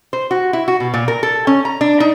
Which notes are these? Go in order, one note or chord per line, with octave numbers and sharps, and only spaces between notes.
C5
F#4
E4
F#4
B2
A#2
A#4
A4
C#4
A#5
D4
D#4